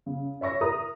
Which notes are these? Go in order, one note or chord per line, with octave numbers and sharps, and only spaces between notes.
C#3
C#5 E5 C#6 A#6
A#4 E5 A#5 D#6